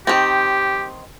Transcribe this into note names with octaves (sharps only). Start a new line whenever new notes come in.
D#3 C4 G4